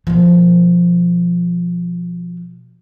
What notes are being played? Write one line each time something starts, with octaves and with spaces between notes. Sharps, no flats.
B2 F3